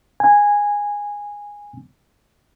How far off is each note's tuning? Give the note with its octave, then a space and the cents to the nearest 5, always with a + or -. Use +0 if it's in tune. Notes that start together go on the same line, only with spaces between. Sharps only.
G#5 -15